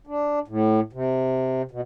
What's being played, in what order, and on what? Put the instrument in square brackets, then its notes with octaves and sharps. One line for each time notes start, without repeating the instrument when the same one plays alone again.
[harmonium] D4
A2
C3
B2